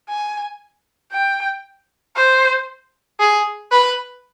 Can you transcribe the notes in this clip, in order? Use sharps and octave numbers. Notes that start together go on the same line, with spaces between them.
G#5
G5
C5
G#4
B4